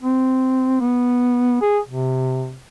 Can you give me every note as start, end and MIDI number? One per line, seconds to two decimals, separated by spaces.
0.02 0.80 60
0.81 1.57 59
1.62 1.78 68
1.89 2.57 48